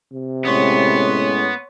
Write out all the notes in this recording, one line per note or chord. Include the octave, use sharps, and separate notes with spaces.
C3
A2 G#3 B3 C#4 C#5 C6